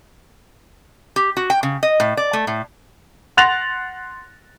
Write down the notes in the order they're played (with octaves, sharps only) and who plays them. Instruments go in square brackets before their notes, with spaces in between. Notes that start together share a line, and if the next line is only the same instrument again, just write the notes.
[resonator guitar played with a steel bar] G4
F#4
G5
C#3
D#5
A2
D5
A3
A2
[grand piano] F#5 C6 F#6 A6 A#6 F7